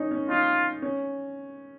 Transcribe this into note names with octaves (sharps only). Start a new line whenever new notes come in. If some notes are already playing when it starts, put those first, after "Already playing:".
Already playing: C#4 D#4
C#4
D#4 F4
C#4